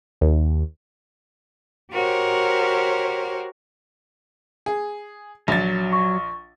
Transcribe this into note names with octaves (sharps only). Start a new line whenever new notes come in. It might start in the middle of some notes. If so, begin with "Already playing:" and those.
D#2
F#4 G4 A#4 C5 C#5
G#4
A#1 F#3 A6
C#6